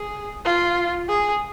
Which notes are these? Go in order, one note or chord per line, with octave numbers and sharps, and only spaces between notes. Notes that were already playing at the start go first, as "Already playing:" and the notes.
Already playing: G#4
F4
G#4